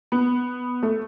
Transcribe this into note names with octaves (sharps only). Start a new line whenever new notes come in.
B3
A3